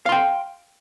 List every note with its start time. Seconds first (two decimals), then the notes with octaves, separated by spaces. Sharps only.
0.06 F5
0.09 C6
0.12 G5